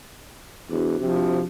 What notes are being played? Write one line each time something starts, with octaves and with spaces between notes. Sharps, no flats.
E2 D4 F#4 C5
C3 F3